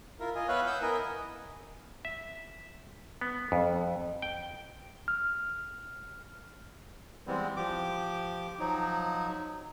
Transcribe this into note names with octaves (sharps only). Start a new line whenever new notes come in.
E4 F4 A#4
F4 D#5 G#5
B3 B4 C#5 E5 F5 F#6
F#5 E6 G6
B3 E4 A#4 D#5 G#5
E5
B3
F2
G5
F6
E3 G3 G#3 B3 C4
F3 G4 D6
F3 F#3 D#4